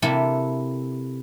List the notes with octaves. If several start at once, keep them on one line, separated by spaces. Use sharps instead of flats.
C3 A#3 C4 E4 A4